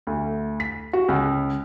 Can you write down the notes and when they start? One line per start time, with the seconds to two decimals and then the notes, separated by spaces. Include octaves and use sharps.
0.07 D2
0.60 B6
0.93 F#4
1.08 C#2